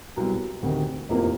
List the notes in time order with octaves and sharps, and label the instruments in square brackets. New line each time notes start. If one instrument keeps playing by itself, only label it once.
[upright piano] C2 B2 F#3
D2 C3 D#3
F1 E2 C3 F3 A#3